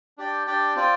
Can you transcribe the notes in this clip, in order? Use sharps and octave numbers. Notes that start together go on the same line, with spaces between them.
D4 G4 D5 G5
D4 G4 D5 G5
C4 F4 D5 G5